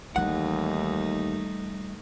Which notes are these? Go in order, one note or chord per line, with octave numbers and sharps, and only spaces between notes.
D#2 E3 G3 A3 D#4 F#5